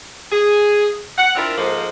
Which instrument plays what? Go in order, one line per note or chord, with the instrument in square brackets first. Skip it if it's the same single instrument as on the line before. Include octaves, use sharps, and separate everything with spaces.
[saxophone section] G#4
F#5
C4 D4 E4 F4 A#4
G#2 F3 G#3 A#3 A4 C5